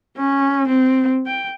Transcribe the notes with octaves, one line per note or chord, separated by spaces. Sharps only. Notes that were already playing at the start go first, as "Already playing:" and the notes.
C#4
C4
G5